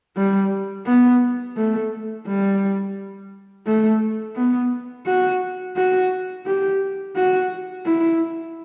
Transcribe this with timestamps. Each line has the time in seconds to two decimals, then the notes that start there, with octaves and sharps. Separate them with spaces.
0.17 G3
0.86 B3
1.57 A3
2.27 G3
3.67 A3
4.36 B3
5.06 F#4
5.76 F#4
6.46 G4
7.16 F#4
7.86 E4